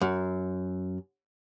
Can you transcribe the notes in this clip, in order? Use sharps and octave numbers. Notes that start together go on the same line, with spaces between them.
F#2